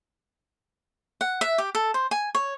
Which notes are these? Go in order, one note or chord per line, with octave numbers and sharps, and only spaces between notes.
F#5
E5
G4
A4
C5
G#5
C#5